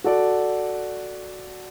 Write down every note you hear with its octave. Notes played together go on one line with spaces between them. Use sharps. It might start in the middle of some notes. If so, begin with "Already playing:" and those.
F#4 A4 D5